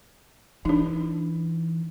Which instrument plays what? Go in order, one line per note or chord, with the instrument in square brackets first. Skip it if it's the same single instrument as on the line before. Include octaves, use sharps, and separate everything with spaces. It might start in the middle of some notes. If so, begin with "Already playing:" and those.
[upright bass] E3 [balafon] D4 D#4